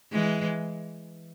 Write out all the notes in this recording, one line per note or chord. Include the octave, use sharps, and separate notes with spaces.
E3 G#3